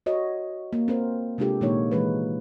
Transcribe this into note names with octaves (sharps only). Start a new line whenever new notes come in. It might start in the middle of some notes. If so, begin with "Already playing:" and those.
F#4 C#5 D#5
A#3
C4 A#4 C5
C3 G#3 D4 F4 G4 A4
A#2 D#3 G#3 A#3 D#4 C#5
E3 G#3 B4